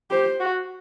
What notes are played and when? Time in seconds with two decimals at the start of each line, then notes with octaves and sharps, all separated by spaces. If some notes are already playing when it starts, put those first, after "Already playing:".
0.11 G4 C5
0.40 F#4